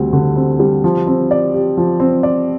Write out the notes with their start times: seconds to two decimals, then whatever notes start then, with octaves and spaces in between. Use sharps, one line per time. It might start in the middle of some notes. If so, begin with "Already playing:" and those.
Already playing: D2 G3 C4
0.13 D3
0.36 C4
0.60 G3
0.84 F3
1.07 C4
1.31 D5
1.54 G4
1.77 F3
2.00 C4
2.23 D5